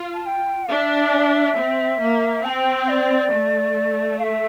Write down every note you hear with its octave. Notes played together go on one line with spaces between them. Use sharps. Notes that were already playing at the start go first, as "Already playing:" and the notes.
Already playing: F4
A5
G5
D4 E5
C4
A#3
C4 G5 A5
D5
A3
F5
E5